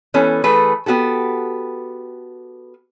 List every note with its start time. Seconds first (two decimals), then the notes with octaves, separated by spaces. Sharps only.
0.14 E3 B3 C#4 A4
0.44 E3 A3 G#4 A4 B4
0.86 B3 F#4 G4 A4